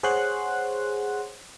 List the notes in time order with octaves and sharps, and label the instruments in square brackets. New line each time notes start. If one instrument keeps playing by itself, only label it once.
[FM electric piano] G#4 C5 C#5 F#5 C6 F#6